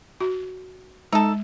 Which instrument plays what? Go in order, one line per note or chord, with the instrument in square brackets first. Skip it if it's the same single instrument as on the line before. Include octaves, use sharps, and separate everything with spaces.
[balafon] F#4
[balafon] G#3 [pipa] D#4 A4